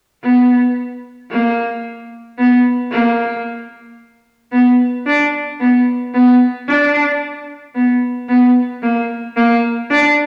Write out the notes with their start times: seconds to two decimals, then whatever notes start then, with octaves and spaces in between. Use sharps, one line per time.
0.23 B3
1.31 A#3
2.38 B3
2.91 A#3
4.52 B3
5.06 D4
5.60 B3
6.14 B3
6.68 D4
7.75 B3
8.28 B3
8.82 A#3
9.36 A#3
9.90 D4